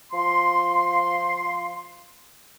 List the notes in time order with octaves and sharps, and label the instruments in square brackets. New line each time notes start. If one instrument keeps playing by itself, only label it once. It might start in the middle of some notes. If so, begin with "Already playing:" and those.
[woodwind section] F3 C6